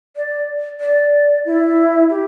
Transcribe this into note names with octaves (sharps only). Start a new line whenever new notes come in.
D5
D5
E4
G4